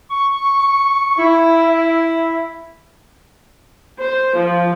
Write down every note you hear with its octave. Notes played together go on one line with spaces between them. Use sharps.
C#6
E4
C5
F3